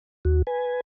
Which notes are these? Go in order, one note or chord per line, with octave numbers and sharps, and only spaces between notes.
D#2 F#4
B4 G#5